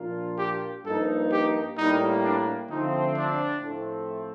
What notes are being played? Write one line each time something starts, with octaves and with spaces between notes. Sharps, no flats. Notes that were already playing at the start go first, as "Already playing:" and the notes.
Already playing: A#2 F3 A#3 D4 F4
G4
G2 F3 A#3 D#4 A4
G4
A2 G3 A#3 D#4
D4
D3 F3 A3 C4 D#4
D4
A2 F3 A3 C4